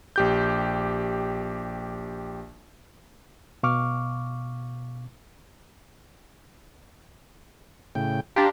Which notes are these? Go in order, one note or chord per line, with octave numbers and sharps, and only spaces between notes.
A#1 G4 G6
B2 F5 C#6 D6 F6
A2 C#3 G5
D4 G4 F5 A#5 C6